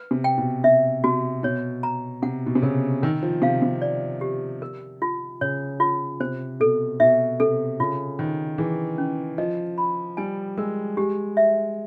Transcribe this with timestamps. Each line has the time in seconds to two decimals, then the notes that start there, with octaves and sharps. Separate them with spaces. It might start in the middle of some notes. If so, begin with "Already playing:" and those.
Already playing: B4
0.11 C3
0.24 G5
0.38 B2
0.64 C3 E5
1.04 C3 F#4
1.43 B2 C#5
1.83 A#5
2.22 C3 F#5
2.46 B2
2.55 C3
2.62 C#3 A#4
3.03 D#3 A#4
3.23 F3
3.42 C3 F5
3.62 C3
3.82 D5
4.21 G4
4.62 A#4
5.02 F4
5.41 C#3 C#5
5.80 F4
6.20 C3 C5
6.60 B2 A4
7.00 B2 E5
7.40 C3 A4
7.80 C#3 F4
8.19 D#3 C5
8.58 E3 G#4
8.98 C#4
9.38 F3 D#5
9.78 B5
10.17 G3 G#5
10.57 G#3 A#4
10.97 G#3 G4
11.37 E5